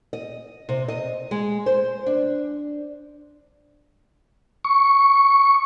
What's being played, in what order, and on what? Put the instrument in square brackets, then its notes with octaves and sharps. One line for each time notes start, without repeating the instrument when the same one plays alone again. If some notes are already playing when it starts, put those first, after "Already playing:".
[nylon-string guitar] D#5
C3
D#5
G#3
C5
D4
[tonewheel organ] C#6